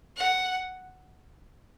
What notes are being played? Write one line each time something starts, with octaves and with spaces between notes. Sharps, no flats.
F#5